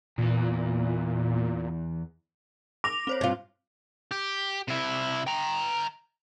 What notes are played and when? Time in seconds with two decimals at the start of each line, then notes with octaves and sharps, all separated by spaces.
0.18 E2 A#2 E3
2.84 D6 A#6 F7
3.07 C4 C5 C#5
3.21 G2 F4
4.11 G4
4.68 C3 E4
5.27 G5 A#5